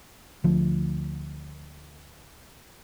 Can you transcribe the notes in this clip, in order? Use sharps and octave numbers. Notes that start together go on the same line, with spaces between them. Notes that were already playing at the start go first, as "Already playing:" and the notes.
D2 F3